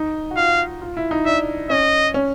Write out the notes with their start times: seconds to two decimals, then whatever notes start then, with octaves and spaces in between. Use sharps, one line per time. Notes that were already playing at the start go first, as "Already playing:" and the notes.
Already playing: D#4
0.31 F#4
0.36 F4 F5
0.81 F4
0.97 E4
1.11 D#4
1.25 D4 E5
1.70 C#4 D#5
2.14 C#4